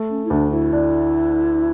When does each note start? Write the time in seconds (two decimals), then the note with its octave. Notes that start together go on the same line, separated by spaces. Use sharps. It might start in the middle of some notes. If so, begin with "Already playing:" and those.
Already playing: A3
0.10 C#4
0.25 E4
0.30 D2 D4
0.52 E4
0.73 D4